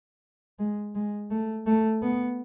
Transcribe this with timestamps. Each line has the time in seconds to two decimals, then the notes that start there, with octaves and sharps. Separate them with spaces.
0.59 G#3
0.95 G#3
1.31 A3
1.67 A3
2.02 B3